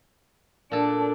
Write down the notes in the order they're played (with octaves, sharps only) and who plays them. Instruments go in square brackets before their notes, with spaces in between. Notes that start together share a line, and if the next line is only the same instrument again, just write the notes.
[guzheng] A#2 A4 [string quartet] D4